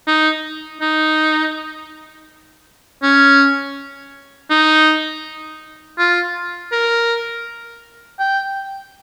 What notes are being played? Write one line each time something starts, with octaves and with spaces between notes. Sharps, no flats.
D#4
D#4
C#4
D#4
F4
A#4
G5